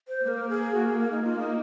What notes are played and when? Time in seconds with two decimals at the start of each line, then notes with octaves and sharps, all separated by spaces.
0.08 C5
0.24 A#3 A#4 C5
0.50 G#4
0.74 F#4
0.87 G#4
0.99 A#4
1.12 D#4
1.24 A#3 F4
1.40 D#4